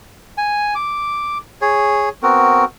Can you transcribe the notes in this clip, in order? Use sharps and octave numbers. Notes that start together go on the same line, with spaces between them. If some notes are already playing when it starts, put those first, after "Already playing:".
G#5
D6
G#4 C#5
B3 C4 F#4 A#4